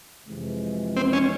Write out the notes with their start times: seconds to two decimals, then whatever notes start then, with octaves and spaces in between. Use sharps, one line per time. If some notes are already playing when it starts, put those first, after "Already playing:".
0.27 F2 C3 E3 G#3
0.96 C4
1.13 C#4